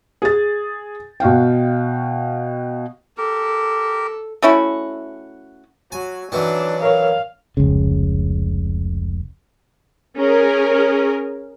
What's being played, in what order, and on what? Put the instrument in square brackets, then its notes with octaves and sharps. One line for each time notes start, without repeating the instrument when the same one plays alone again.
[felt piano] G#4 A6
B2 F#4 F5 G5
[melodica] G4 A#4 [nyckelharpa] A4
[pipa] A3 C#4 E4 F#4
[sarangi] F#3 [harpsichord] G#5
[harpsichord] D#3 E3 F#3 [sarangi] D4
[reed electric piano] A#4 C#5 [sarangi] F5
[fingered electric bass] F1 C#2 C#3
[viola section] C#4 G#4 A#4